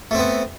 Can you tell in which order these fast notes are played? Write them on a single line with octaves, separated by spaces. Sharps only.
A3 C4 B3